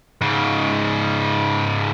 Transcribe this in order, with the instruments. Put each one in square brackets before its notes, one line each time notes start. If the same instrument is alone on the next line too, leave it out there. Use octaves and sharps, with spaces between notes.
[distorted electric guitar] G#2 C#3